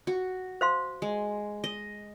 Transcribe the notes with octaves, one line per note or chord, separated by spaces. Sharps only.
F#4
C5 F5 C6
G#3
D#5